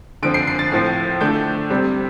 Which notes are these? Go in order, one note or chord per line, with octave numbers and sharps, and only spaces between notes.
D3 F3 C4 D7
C7
C7
A6
A2 F3 C4
D3 A3 D4 G6
C3 G3 C4